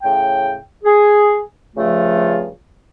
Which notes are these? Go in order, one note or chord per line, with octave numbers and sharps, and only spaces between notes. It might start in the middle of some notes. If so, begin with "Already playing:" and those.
A2 C#3 G5
G#4
G2 C#3 F3 A3 F4